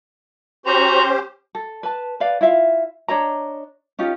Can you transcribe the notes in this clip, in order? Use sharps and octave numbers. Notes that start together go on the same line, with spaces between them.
C#4 F#4 G4 C5 A#5 C6
A4
B4 A5
B4 D5 F5
E4 F4 E5 F5
D4 C#5 D#5 A#5
C#4 D#4 F4 G4